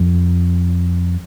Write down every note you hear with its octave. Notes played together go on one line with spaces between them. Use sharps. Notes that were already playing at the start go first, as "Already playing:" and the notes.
Already playing: F2